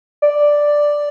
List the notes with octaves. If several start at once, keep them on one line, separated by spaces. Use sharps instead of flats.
D5